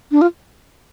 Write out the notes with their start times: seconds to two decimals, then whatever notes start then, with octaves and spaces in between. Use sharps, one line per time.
0.11 D4
0.21 F4